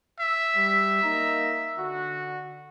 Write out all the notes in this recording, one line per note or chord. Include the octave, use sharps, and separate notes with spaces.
E5
G3
A#3 D#4 A#5
D3 F#4